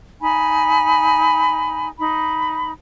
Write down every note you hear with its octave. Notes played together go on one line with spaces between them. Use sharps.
D#4 G#5 B5
D#4 B5